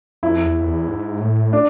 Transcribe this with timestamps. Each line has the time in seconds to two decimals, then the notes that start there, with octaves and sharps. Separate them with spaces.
0.23 F2 E4
0.44 E2
0.60 F2
0.66 E2
0.88 G#2
1.21 A2
1.53 D4